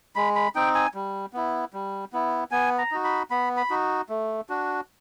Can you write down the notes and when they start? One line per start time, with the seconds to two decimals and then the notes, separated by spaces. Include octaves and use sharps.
0.16 G#3 B5
0.35 B5
0.55 C4 D#4 G5
0.75 G#5
0.94 G3
1.33 B3 E4
1.73 G3
2.13 B3 E4
2.51 B3 G#5
2.78 A#5
2.91 D#4 F#4
3.04 B5
3.31 B3 B5
3.57 B5
3.70 D#4 F#4
4.09 A3
4.49 D4 F#4